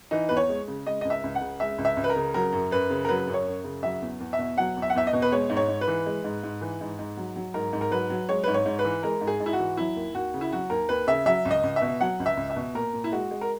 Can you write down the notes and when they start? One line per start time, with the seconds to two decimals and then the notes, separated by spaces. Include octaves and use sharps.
0.11 E3 D#4
0.29 E2 B4
0.37 C#5
0.49 G#3
0.68 C#3
0.86 G#3 D#5
1.01 C#2 D#5
1.10 E5
1.24 C#2
1.35 F#5
1.41 C#3
1.60 G#3 E5
1.78 C#2
1.85 E5
1.97 C#2
2.04 B4
2.10 A#4
2.16 C#3
2.34 F#3 A#4
2.52 F#2
2.71 F#2 B4
2.90 C#3
3.05 A#4
3.09 F#3 B4
3.27 F#2
3.34 C#5
3.47 F#2
3.64 C#3
3.83 F#3 E5
4.02 E2
4.20 E2
4.33 E5
4.39 B2
4.58 F#3 F#5
4.76 E2
4.82 E5
4.90 F#5
4.95 E2 E5
5.07 D#5
5.13 B2
5.22 B4
5.32 G#3 C#5
5.50 G#2
5.57 C#5
5.68 G#2
5.81 B4
5.87 E3
6.06 G#3
6.24 G#2
6.43 G#2
6.61 E3
6.81 G#2
6.99 G#2
7.17 F#3
7.36 F#3
7.54 G#2 A#4
7.73 G#2
7.81 A#4
7.91 F#3 B4
8.10 F#3
8.29 G#3 C#5
8.44 G#2 B4
8.54 C#5
8.66 G#2
8.79 B4
8.85 E3
9.03 G#3 A#4
9.21 G#2
9.27 G#4
9.40 G#2
9.46 E4
9.53 F#4
9.59 E3
9.77 F#3 E4
9.96 D#2
10.14 D#2 F#4
10.34 C#3
10.41 E4
10.52 F#3 F#4
10.70 D#2 A#4
10.89 D#2 B4
11.07 C#3 E5
11.26 F#3 E5
11.45 C#2
11.51 D#5
11.63 C#2
11.76 E5
11.81 B2
12.00 F#3 F#5
12.20 C#2
12.26 E5
12.37 C#2
12.50 E5
12.56 B2
12.74 A#2 A#4
12.93 A#2
13.04 E4
13.12 G#3 F#4
13.31 G#3
13.41 A#4